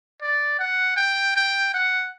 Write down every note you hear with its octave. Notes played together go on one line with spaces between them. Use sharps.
D5
F#5
G5
G5
F#5